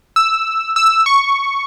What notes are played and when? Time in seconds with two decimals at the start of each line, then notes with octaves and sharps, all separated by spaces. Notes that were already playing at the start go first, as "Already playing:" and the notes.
0.16 E6
0.76 E6
1.06 C#6